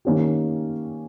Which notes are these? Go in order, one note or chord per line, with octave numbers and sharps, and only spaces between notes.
D#3 A#3 C#4 G4